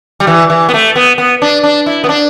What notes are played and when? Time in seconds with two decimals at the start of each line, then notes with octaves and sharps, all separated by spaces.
0.20 G3
0.27 E3
0.50 E3
0.69 B3
0.74 A3
0.96 B3
1.18 B3
1.42 D4
1.63 D4
1.86 E4
2.04 B3
2.09 D4